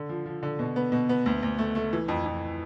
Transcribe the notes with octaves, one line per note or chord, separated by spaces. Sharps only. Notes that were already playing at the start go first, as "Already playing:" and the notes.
Already playing: D3
F3
F3
D3
B2
B3
B2
B3
D2
D2
A3
A3
E3
F2
F2